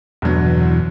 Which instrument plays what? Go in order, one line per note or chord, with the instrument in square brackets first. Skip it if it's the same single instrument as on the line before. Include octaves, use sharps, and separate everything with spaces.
[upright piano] G1 D3 F#3 [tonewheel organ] E2 B2 [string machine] E3